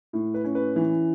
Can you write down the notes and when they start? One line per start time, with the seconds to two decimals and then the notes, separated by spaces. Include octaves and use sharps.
0.13 A2
0.34 B4
0.44 C#4
0.55 B4
0.76 E3